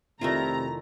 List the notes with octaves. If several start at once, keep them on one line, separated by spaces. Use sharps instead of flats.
F1 C3 D#3 A3 E4 F4 D5 A#5